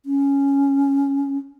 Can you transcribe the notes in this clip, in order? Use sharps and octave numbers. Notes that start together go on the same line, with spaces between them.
C#4